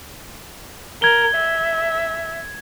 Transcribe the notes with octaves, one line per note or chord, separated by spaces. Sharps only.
A#4 G#6 G7
E5